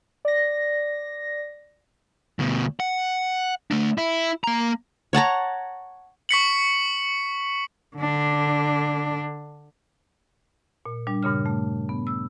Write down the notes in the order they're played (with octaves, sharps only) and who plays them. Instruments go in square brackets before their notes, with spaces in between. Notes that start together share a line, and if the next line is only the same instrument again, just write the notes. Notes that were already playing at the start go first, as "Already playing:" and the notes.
[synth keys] D5 A#6
[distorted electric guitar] D2 B2
F#5
A3 D4
E4
A#3 A#5
[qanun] C#5 F#5 A5 A#5
[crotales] C#6 B6 C#7 F#7
[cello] D3 D4
[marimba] A#2
G3 D4
G2 A#2 C#3 F6
A3
B3
E6